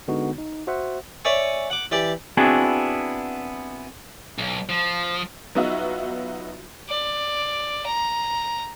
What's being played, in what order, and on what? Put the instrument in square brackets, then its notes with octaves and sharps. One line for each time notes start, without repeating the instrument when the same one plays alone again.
[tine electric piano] D3 G#3 B3 D#4 F#4
D#4
F#4 C5 E5 F#5
[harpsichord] C#5 D5 E5 G#5 C#6
F#5 D6
E3 G4 D5
[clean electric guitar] B3 C4 D4 E4 F#4 G#4
[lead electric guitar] B1
F3
[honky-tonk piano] F#3 B3 D#4 F4 F#4 E5
[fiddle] D5
A#5